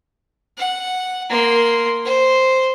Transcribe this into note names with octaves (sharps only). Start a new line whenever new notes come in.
F#5
A#3 C6
C5